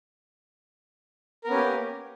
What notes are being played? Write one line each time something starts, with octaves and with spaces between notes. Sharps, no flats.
A#3 B3 C#4 G4 A#4